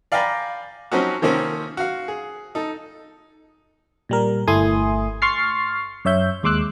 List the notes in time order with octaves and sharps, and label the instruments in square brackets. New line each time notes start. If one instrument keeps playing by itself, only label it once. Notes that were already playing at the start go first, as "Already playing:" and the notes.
[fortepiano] D5 F5 G5 G#5 A#5 B5
F3 F#3 C4 C#4 D#4 F#4
C3 D#3 F3 A#3 C4 C#4
F#4 F5
G#4
D#4 A4
[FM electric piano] A#2 G3 A#4
G1 A3 E4 G#5 C6 D#6
C6 C#6 F6 A6 C7
F#2 C#5 E5 G6
D#2 G#3 C6 D6 E6 F#6